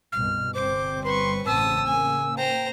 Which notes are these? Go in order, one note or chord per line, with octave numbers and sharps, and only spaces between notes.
C2 G2 B2 F6
G1 G3 C4 C5 D6
B4 C6 C#6
A1 C#3 C4 A5 D#6 E6
C#3 A#3 G#5
C5 G5 A#5